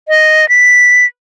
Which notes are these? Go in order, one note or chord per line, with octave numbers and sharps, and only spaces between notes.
D#5
B6